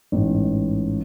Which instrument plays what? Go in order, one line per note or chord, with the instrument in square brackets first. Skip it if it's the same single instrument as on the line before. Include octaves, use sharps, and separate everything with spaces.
[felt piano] A1 G#2